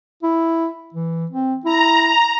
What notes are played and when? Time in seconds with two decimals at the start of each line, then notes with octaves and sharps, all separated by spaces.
0.23 E4
0.94 E3
1.31 C4
1.65 E4 A#5